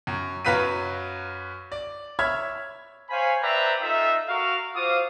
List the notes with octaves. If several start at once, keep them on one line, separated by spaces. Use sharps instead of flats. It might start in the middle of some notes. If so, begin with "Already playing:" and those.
F#2
F#2 F#3 B4 F5 B6 D#7
D5
C#5 E5 B5 F6 G#6
C5 C#5 F5 G#5 B5
B4 C5 D5 E5 G5 A#5
D#4 F4 A4 E5
F#4 A#4 F5
F4 F#4 C5 F5 D6 D#6